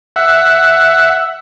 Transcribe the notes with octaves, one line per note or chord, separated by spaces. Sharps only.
E5 F#5